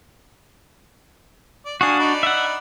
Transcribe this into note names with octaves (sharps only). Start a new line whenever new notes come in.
D5
D4 F#4 F5 G#5 D#6
D#4 D5 B5
E5 F#5